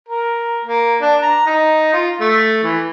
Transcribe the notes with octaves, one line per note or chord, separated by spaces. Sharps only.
A#4
A#3
D4
A#5
D#4
F4
A3
E3